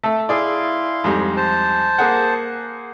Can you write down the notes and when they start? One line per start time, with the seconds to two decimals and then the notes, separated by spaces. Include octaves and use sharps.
0.03 A3 A4
0.29 E4 G#4 D5 F5 C6
1.04 F2 G#2 G3
1.37 C5 A5
1.98 A#3 G#4 F#5